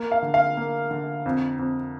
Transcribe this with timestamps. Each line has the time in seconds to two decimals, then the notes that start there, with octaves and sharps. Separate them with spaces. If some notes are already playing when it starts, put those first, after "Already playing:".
Already playing: A#3
0.12 F5
0.23 D3
0.34 F5
0.57 A#3
0.91 D3
1.26 F2
1.59 F2